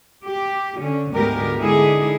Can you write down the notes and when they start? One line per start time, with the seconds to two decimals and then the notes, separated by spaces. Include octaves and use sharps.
0.24 G4
0.78 D3 C#4
1.13 D2 G#2 G#3 B3 G4 A#4
1.58 D3 G#3 D#4 E4 G#4